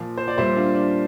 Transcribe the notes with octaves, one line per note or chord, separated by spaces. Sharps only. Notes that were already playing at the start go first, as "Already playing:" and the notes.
Already playing: A#2 F3
C5
D5
A#2 G3 C5 E5
D4 F4
D4